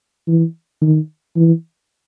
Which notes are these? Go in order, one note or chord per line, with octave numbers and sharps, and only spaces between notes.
E3
D#3
E3